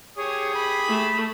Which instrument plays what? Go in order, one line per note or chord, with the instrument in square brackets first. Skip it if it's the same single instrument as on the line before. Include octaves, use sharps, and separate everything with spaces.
[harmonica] G4 G#4 D#6 [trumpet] C#5
[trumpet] B5
[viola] A3